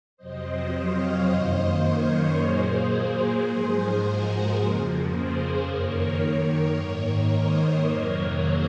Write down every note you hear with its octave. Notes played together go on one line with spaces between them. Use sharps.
F2 C3 F#3 C4 C5 D#5
C#5 F5
F#2 D#3 A#3 C5 D#5
A#4 C#5
A#2 F#3 A#3 G#4 C5
G#2 F3 G#3 G#4 C5
F#4 A#4
F2 C#3 F3 A#3
G#4 C5
F#2 D#3 A#3 A#4 C#5
A#4 C#5
G#2 D#3 A#3 A#4 C#5
C5 D#5
F2 C3 D#3 F#3 A#3 A#4 C#5
G#4 C5